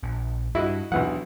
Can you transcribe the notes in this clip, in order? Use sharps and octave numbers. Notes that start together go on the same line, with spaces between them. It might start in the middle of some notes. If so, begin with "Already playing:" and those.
A#1
G2 E4 F#4 D#5
B1 E3 F#3 D4 F#5